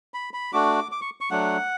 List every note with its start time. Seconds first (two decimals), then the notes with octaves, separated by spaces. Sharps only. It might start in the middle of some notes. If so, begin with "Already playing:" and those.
0.14 B5
0.34 B5
0.53 A3 D4 F#4 D6
0.92 D6
1.01 C#6
1.21 C#6
1.31 F#3 A3 D4 F#5